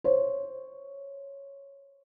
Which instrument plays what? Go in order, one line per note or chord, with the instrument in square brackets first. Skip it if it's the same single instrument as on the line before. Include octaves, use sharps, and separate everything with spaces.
[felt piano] C5 C#5